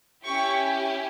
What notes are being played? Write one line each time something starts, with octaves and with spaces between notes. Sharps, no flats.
C#4 E4 G4 C#6